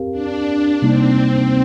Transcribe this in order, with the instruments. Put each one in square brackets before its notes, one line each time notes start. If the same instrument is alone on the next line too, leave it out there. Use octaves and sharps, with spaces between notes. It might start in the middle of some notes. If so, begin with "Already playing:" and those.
Already playing: [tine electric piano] C4 G4 A#4 F5
[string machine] D4
[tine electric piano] C3 G3 A#3 D#4 [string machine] C4